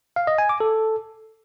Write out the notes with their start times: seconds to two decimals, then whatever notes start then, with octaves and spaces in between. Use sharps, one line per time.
0.16 F5
0.27 D#5
0.38 G#5
0.49 D6
0.60 A4